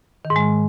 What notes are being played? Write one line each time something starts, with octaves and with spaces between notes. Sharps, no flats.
D#3
G#2
G#3